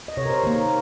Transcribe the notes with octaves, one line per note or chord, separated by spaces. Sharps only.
D#5
C3 C#5
A#4
C5
D#3 A#3 A#4
A#4